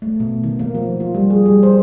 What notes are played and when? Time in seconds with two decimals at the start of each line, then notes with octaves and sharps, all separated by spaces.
0.02 A3
0.20 B2
0.44 D#3
0.59 A#3
0.75 F3
1.00 F4
1.15 G3
1.30 G#4
1.46 G3
1.63 C5